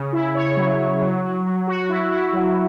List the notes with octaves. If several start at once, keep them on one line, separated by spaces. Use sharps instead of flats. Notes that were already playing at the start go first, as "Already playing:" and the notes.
Already playing: C#3
E4
C#5
F#3
F#3
F#3
F#3
F#3
F#4
E4
E4
F#3